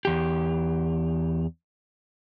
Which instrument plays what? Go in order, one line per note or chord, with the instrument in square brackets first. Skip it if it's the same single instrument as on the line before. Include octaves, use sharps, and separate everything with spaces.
[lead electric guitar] E2 G4